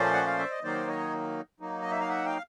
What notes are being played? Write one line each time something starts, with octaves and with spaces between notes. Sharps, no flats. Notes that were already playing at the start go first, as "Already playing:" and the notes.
Already playing: A#2 F3 A3 C#4 C5 D5
F#5
F5
E5
D#5
D#3 F#3 A#3 D#4 C5 D5
C#5 D#5
F#3 A#3 D#4
D#5
E5
F5
E5 F#5
F5 G5